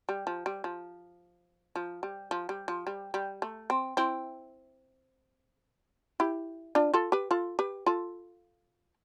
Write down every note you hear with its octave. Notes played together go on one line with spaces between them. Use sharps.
G3
F3
G3
F3
F3
G3
F3
G3
F3
G3
G3
A3
C4
C4 E4
E4 G4
D4 F4
F4 A4
G4 B4
F4 A4
G4 B4
F4 A4